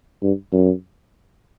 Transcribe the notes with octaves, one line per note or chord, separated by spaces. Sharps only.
G2
F#2